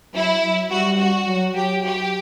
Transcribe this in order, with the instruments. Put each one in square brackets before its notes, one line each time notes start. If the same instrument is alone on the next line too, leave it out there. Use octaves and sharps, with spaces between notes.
[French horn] F#3 [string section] E4
[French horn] F#3
[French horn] G3 [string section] F#4
[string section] F#4
[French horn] F#3
[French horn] F#3 [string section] G4
[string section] G4